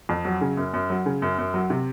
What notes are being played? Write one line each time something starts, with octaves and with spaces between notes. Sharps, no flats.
F2
F#3
C#3
F#2
F#2
F#3
C#3
F#2
F#2
F#3
C3